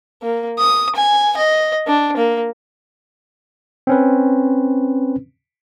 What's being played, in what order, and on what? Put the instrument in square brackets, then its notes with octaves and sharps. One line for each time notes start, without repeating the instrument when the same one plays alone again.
[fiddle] A#3
D#6
G#5
D#5
D4
A#3
[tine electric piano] C4 C#4 B4